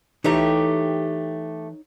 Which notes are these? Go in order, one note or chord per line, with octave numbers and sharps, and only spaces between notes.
E3 A3 D#4 G4 C#5 A#5